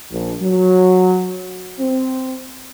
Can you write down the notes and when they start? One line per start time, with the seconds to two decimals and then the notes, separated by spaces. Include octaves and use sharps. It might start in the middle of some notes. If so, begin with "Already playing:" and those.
0.11 A#1
0.41 F#3
1.80 C4